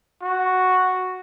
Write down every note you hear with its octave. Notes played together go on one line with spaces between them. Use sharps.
F#4